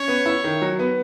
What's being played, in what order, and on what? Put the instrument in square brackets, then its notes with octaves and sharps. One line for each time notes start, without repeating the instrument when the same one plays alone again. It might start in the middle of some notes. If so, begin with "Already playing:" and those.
Already playing: [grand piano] C#4 [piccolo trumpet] C#5
[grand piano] B3
E4
D#3
F#3
B3